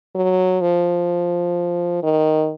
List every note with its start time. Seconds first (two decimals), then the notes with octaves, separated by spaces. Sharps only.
0.15 F#3
0.61 F3
2.03 D#3